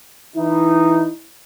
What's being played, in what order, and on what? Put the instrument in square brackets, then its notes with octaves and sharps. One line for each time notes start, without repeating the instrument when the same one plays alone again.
[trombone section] E3 D#4 [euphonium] E4